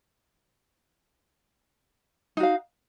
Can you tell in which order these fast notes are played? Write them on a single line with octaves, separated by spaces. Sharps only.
D#4 F#4 F5